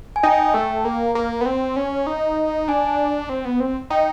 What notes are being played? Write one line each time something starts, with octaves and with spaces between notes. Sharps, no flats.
G#5
D#4 G5
A3
A#3
A#3
B3
C4
C#4
D#4
D4 G#5
C4
B3
C4
D#4 G5